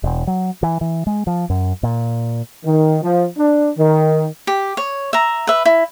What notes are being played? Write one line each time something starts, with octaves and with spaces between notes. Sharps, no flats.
E1
F#3
E3
E3
G#3
F3
F#2
A#2
D#3
F3
D4
D#3
G4
C#5
E5 A#5
B4 E5
E4